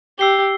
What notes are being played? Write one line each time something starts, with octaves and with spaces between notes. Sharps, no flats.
G4 E6 C7 G7